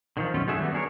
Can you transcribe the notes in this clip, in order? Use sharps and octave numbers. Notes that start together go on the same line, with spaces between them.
D3 D#3 F3
F#2 B2 A3 C#4 F4
F#2 D#3 A3 F#4 G#4 E5
G3 A3 B3 F#4
B3 D4 G#4 A#4 C#5